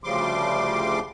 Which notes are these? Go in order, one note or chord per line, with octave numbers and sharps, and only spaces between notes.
D2 C#3 F3 G3 C6 D6